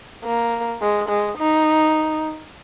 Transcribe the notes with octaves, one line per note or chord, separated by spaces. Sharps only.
A#3
G#3
G#3
D#4